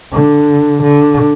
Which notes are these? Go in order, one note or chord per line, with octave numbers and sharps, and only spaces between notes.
D3
D3